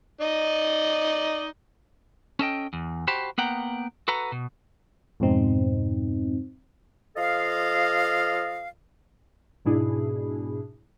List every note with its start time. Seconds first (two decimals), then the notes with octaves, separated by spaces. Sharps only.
0.21 D#4 D5 D#5
2.39 C#4 A4 D#5 G5
2.73 E2
3.07 F#4 G4 C5 A5 B5
3.38 A#3 B3 F#5 G5 A#5
4.08 F#4 A4 B4 F#5 A#5
4.32 B2
5.20 F2 G#2 B2 C4 D#4
7.16 F3 A4 D#5 F5
9.65 G#2 B2 D4 E4 G#4